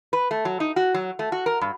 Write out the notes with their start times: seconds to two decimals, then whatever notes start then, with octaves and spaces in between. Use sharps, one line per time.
0.13 B4
0.31 A3
0.45 F#3
0.60 D#4
0.76 F#4
0.94 F#3
1.19 A3
1.32 F#4
1.46 A#4
1.61 G2